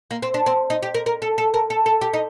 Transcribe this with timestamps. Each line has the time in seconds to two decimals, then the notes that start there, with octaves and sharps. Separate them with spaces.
0.11 A#3
0.22 C4
0.34 D4
0.46 C4
0.70 D#4
0.83 G4
0.94 A#4
1.06 A#4
1.22 A4
1.38 A4
1.54 A#4
1.70 A4
1.86 A4
2.01 G4
2.13 D#4